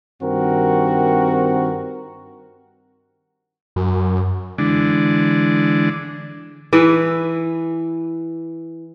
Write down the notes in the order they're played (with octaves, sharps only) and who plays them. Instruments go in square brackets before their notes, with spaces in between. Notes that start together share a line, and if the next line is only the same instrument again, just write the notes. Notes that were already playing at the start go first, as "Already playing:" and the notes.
[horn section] G2 D#3 C4 F#4 A#4
[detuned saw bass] F#2
[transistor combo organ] D3 E3 G#3 D4
[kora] E3 E4 B4